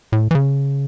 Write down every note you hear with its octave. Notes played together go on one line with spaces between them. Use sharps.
A2
E3
C#3